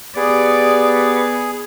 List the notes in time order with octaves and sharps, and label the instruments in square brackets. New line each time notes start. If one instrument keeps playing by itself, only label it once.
[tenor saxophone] B3 [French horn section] G4 [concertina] G#4 [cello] D5